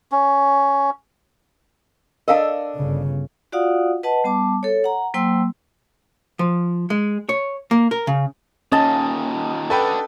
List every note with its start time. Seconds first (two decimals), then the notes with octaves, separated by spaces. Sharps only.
0.12 C#4
2.28 D4 A4 A#4 D#5 F5 A5
2.76 G1 C#3
3.52 F4 F#4 D5 F5 F#5 D#6
4.03 B4 D#5 F#5 A5
4.24 G3 B3 A5 D6
4.63 A4 C#5
4.84 F#5 A#5
5.14 F#3 A#3 C5 G5 C6 E6
6.39 F3
6.90 G#3
7.29 C#5
7.71 A#3
7.91 A#4
8.07 C#3
8.72 D#2 A#2 C#4 D#5 A5
9.70 D4 F#4 A4 B4 G5